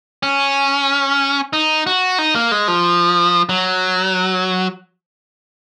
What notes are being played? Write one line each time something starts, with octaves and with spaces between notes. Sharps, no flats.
C#4
D#4
F#4
D#4
A#3
G#3
F3
F#3